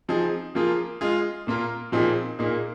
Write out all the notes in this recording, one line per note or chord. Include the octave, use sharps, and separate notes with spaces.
F3 C4 D#4 G#4
F3 A#3 F4 G#4
G#3 F4 G#4
A#2 A#3 F4 A#4
A#2 F3 C4 D#4 G#4
A#2 A#3 D#4 G#4